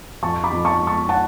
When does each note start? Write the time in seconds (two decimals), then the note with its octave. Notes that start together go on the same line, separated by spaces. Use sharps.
0.23 F2 A5 C#6
0.44 B5 D6
0.51 F2
0.65 A5 C#6
0.80 G#3
0.87 A5 C#6
1.09 F#5 A5